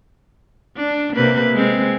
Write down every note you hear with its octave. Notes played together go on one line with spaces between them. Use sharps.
D4
C3 A#3 B4
G#3 C4